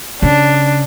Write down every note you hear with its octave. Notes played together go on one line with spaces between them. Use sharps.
C#3 D4